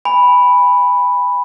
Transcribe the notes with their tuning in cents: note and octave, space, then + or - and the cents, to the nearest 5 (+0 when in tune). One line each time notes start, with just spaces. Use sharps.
G#5 -25 B5 +0